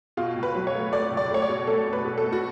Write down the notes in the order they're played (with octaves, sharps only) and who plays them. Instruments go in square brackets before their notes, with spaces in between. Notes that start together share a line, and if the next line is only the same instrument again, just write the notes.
[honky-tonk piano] B2 F4
C#2
B4
F#3
C#5
A3
A3 D5
C#2
D5
A3 C#5
D5
B2
A3 A4
A3
B4
B2
A4
A3
F#4